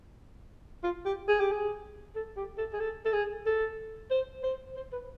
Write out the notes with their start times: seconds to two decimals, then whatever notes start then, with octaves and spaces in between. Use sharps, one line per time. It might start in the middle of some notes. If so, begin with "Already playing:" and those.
0.84 F4
1.05 G4
1.28 G#4
1.40 G4
1.51 G#4
2.15 A4
2.37 G4
2.58 A4
2.73 G#4
2.80 A4
3.05 A4
3.13 G#4
3.46 A4
4.11 C5
4.43 C5
4.77 C5
4.92 B4